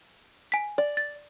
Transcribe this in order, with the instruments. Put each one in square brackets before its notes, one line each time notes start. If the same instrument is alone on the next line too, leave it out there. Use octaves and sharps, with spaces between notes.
[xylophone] G#5 B6
[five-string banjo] D5
[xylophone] A6